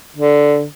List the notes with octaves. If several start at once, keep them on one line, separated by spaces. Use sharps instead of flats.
D3